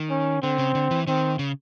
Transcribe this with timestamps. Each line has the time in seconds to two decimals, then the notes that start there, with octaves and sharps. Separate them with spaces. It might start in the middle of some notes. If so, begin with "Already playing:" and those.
Already playing: D#3
0.10 C#4
0.43 D3 C4
0.58 C#3
0.75 D3
0.91 E3
1.07 D#3 C4
1.39 C#3